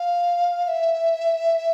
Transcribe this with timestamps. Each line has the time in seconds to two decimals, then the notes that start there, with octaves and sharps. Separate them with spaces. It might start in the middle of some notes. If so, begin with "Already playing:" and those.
Already playing: F5
0.68 E5